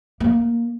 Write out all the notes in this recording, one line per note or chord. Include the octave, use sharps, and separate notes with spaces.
A#3